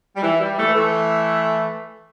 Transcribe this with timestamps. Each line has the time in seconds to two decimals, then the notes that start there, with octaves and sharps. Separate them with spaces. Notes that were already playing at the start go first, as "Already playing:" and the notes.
0.16 G3
0.23 E3
0.40 G3
0.57 E3 A3
0.73 E3 A3